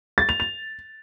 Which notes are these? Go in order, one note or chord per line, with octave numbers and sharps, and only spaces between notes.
A6
F7
F7